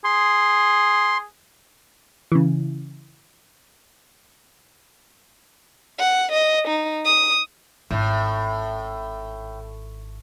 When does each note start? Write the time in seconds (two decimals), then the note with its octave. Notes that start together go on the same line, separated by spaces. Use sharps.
0.05 G#4 C6
2.32 C#3 E3
5.99 F#5
6.32 D#5
6.68 D#4
7.05 D#6
7.91 G#1 A2